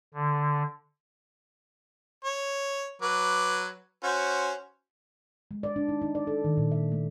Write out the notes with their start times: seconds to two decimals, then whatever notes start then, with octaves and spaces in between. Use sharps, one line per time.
0.14 D3
2.24 C#5
3.02 F#3 B4 D6
4.03 C#4 F#4 C5
5.51 G#3
5.63 D5
5.76 D4
5.89 D#4
6.02 D#4
6.15 D5
6.27 A4
6.44 D#3
6.57 A#2
6.72 E5
6.92 A3